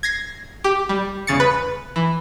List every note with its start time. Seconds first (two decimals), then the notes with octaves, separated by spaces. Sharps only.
0.03 G#6 A#6 C7
0.64 G4
0.89 G3
1.27 E2 C#3 A6 C#7
1.40 B4
1.96 E3